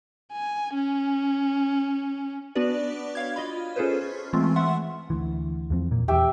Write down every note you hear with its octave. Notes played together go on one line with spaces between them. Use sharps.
G#5
C#4
B3 D4 F#4 B4 D5
C#5 F5 G#6
F4 D#5 B5
C#4 F4 G#4 A4 B4 C5
E3 G#3 A3 C4 F4
E5 F#5 C6
D2 E3
E2 F3 C4
A#2 A#3
E1 E2 G4 E5 G5